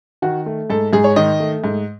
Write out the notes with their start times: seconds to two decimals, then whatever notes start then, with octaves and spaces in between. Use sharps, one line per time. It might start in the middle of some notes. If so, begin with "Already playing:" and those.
0.22 D#3 F#4
0.46 A3
0.70 G#2 A4
0.93 G#2 G#4
1.04 C#5
1.16 D#3 D#5
1.40 A3
1.64 G#2